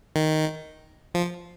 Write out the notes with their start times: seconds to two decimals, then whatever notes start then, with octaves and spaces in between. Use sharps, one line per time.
0.16 D#3
1.14 F3